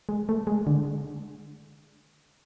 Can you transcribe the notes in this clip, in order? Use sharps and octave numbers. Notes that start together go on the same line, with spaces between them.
G#3
A3
G#3
D3